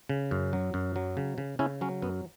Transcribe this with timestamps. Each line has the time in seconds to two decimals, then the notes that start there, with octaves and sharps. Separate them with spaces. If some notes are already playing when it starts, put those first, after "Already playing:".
0.09 C#3
0.31 F#2
0.53 F#3
0.74 F#2
0.96 F#3
1.17 C#3
1.38 C#3
1.59 C#3 C#4 E4
1.81 F#3 C#4
2.02 F#2 B3